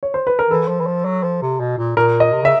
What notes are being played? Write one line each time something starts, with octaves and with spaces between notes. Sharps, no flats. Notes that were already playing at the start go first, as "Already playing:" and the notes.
C#5
C5
B4
A#4
E3 A4
F3
E3
F3
F#3
F3
C3
B2
A#2
A#2 A#4
D#5
C3
C#3 E5